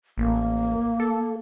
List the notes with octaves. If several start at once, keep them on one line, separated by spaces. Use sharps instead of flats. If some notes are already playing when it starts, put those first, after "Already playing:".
A1 A#3
A4